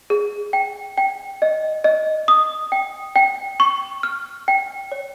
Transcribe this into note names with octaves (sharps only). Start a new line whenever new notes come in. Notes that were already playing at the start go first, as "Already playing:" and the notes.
G#4
G5
G5
D#5
D#5
D#6
G5
G5
C#6
F6
G5
C#5